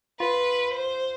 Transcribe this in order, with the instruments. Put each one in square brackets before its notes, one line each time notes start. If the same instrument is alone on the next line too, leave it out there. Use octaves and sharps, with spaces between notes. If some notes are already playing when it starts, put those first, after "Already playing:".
[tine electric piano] F4 [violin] B4
[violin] C5